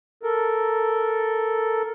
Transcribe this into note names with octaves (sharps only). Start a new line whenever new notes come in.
A4 A#4